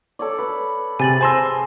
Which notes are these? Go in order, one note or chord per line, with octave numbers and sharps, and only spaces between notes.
A4 C#5 D5
B4
C3 G#4 G#5 A6 F#7
C5 G#5 A5 C6 E6 A#6